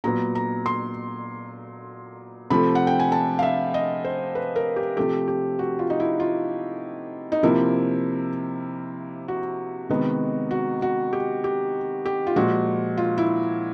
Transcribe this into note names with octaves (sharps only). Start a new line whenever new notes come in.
A#2 F#3 B3 A#5
A#5
C6
C3 F3 A3 B5
F#5
G5
G#5
A5
F5
E5
D#5
C5
B4
A#4
G4
C3 F3 A3 G4
G4
F#4
F4
D#4
E4
F4
D#4
C3 F3 A#3 E4
F#4
C3 D#3 G#3 B3
F#4
F#4
G4
G4
G4
F4
A#2 F3 G#3 F#4
F4
E4